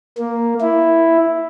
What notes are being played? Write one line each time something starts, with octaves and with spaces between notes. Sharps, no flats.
A#3
E4